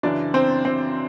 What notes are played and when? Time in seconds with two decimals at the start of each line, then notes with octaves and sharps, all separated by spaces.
0.03 F#2 C#3 E3 D4 D5
0.34 C4 C5
0.65 C4 C5